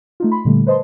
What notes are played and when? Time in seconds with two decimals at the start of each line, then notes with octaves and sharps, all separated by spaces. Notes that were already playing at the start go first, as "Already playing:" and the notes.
0.20 A3 D#4 F4
0.31 B5 C6
0.45 A#2 D3 G3 A3
0.66 B4 C5 D#5 A5 C6